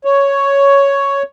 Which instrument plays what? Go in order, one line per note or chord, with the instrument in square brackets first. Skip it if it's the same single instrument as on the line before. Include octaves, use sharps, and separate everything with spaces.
[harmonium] C#5